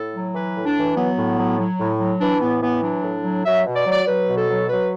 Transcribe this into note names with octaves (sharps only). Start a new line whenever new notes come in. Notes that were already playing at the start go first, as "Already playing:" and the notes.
Already playing: A2 A4
F#3
E3 B4
A2
D4
E3
F#3 B3
A2
F#3
F#3
A2
F#3
E3 D4
A2 B3
E3 B3
F#3 D4
A2
F#3
F#3 E5
B2
D5
F#3
D5
F#3 B4
B2
A4
F#3
F#3 B4